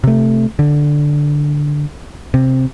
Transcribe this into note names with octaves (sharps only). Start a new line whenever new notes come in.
C3 A3
D3
C3